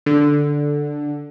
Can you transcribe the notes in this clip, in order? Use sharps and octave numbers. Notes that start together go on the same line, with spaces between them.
D3